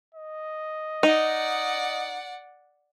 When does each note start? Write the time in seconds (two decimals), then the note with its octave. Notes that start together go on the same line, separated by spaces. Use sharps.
0.15 D#5
1.03 D#4 D5 F#5